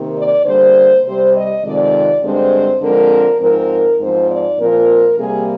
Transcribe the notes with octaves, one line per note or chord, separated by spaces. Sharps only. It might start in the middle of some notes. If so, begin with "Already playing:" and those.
Already playing: C3 D#3 A#3
D5
D3 G3 A#3 C5
C3 G3 C4 C5
D#5
F2 C3 D#3 G#3 D5
G2 D3 G#3 C4 C5
D3 F3 G#3 C4 A#4
G#2 F3 C4 A#4
G#2 F3 C4 C5
D5
A#2 F3 C4 A#4
C3 G3 A#3 G#4